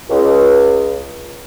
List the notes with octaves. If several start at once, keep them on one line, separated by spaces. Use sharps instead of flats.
C#2